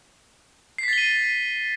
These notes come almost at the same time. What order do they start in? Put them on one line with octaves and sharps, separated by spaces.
C7 B6 A6 G7 D#7